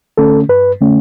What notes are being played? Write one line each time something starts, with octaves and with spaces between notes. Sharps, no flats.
D3 A3 C#4 A4
G2 B4
D3 A3 C#4